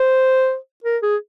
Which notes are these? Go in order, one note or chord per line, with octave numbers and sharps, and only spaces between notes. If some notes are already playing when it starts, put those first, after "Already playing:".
Already playing: C5
A#4
G#4